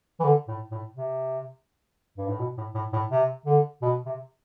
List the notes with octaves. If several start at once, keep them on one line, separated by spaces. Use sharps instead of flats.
E3
D3
A2
A2
C3
G2
A2
B2
A2
A2
A2
C3
D3
B2
C3